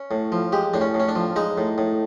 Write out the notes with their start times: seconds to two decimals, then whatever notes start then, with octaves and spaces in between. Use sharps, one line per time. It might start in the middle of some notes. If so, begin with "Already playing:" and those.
Already playing: C#4
0.11 A2
0.32 F3
0.53 G#3 G4
0.74 A2 D4
0.81 C#4
0.94 A2
1.00 C#4
1.09 D4
1.16 F3
1.36 G#3 D#4
1.58 A2
1.78 A2